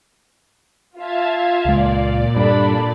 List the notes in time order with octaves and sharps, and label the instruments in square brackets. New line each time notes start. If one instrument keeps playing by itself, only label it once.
[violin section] F4 F5 [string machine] E5 A5 G#6
[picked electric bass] C#2 G#3 [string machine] A#2 D5
[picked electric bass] G2 [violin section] D4 A4 B5